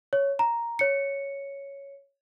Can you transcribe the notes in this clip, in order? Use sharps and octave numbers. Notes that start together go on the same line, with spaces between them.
C#5
A#5
C#5 C#7